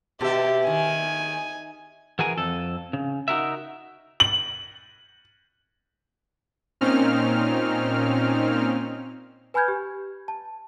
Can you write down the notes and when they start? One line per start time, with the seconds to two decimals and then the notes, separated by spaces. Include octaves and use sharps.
0.21 B2 G4 E5
0.67 D#3 G#5
2.19 E3 F#4 G#4 A#4 G#5
2.37 F2 A4
2.93 C#3
3.28 D#4 F#4 A#4 E5
4.20 F#7
6.81 A#2 C4 C#4 D#4 F6
9.54 B4 G#5 B5 F6 G6 G#6
9.68 G4
10.28 A5